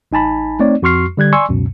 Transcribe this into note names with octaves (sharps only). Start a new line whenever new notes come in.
A1 D#4 G#5 A5 B5
A3 C4 D#4 C#5 D5
F2 F#4 C6 C#6 F6 C7
D3 G3 F#6 G#6
D5 G#5 C6 C#6 E6
C#2 F#2 B2